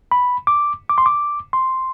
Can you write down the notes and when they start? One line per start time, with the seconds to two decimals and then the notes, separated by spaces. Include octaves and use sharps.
0.11 B5
0.47 D6
0.89 D6
0.98 C6
1.06 D6
1.53 C6